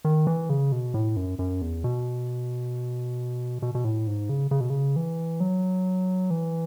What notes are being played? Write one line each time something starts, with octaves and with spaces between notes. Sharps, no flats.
D#3
E3
C#3
B2
A2
F#2
F#2
E2
B2
B2
B2
A2
G#2
C#3
C#3
B2
C#3
E3
F#3
E3